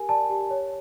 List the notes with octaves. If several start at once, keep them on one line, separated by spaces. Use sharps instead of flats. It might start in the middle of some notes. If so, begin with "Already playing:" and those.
Already playing: G4 A#4 G#5
D5 A5
G4
C#5